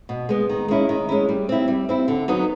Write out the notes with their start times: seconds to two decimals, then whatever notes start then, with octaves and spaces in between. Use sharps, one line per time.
0.09 B2
0.29 G#3 B3
0.49 D#3
0.68 G#3 C#4 E4
0.89 D#3
1.09 G#3 C#4 E4
1.29 G3
1.49 C4 E4
1.68 G3
1.89 C4 E4
2.08 D3
2.28 F#3 B3 D#4